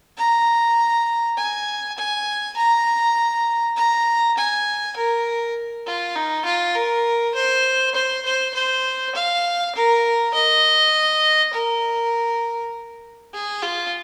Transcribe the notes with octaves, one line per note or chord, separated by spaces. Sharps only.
A#5
G#5
G#5
A#5
A#5
G#5
A#4
F4
D#4
F4
A#4
C5
C5
C5
C5
F5
A#4
D#5
A#4
G#4
F4